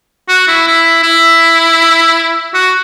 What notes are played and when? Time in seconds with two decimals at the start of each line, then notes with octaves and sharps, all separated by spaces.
0.28 F#4
0.48 E4
0.67 E4
1.03 E4
2.54 F#4